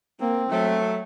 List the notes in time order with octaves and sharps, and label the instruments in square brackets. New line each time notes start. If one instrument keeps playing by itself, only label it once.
[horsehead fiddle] A#3 [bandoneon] C4
[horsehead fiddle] F#3 [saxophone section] A3